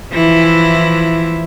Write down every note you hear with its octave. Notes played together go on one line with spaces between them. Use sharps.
E3 F3 E4